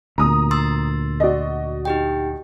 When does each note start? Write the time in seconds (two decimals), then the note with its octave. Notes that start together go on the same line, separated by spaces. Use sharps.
0.18 D2 A#2 A#5 D#6
0.51 C6 E6 A6
1.20 F#4 D5 D#5
1.85 D#4 G4 G5